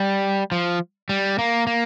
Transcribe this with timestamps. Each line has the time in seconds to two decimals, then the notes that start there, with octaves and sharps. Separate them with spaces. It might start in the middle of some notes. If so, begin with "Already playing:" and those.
Already playing: G3
0.52 F3
1.09 G3
1.39 A#3
1.67 A#3